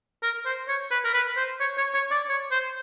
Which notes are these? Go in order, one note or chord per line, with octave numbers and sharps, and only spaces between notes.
A#4
C5
C#5
B4
A#4
B4
C5
C#5
C#5
C#5
D5
C#5
C5